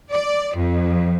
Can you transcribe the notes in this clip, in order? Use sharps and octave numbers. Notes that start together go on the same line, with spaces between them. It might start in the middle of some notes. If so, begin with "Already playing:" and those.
D5
F2